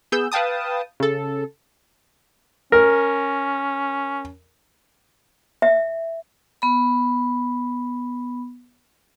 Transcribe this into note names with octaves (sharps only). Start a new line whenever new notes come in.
B3 G#4 E6 G6
B4 F5 G5 A5 D#6
C#3 A4
C#4 A#4
E5
B3 B5